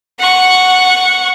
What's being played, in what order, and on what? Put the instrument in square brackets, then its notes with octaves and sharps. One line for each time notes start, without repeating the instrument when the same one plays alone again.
[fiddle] F#5 C#6